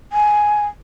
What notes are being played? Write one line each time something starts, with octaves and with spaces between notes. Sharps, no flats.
G#5